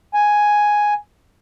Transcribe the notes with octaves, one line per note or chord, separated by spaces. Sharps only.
G#5